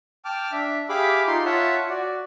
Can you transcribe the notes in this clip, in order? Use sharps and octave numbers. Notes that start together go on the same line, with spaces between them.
G5 A5 D6 F6
D4 E5
G4 G#4 E5 F5 B5 D6
D#4 F4 C6
F4 C#5 E5 F#5 A5
F#4 D5